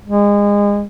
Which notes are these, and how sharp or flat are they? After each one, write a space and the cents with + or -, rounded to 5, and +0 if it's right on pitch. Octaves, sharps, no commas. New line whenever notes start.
G#3 -30